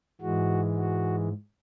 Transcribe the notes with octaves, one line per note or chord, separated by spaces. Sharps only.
G#2 E3 G#3 F#4
F#4